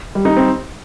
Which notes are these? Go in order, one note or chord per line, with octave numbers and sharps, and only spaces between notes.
G3
D#4
C4